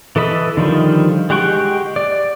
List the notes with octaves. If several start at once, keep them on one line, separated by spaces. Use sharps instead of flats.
E3 A4 D#5 B5
D3 D#3 F3 G3
G#3 G4 F#5 G5 C#6
D5